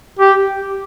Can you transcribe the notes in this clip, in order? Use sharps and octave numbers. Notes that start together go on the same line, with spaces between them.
G4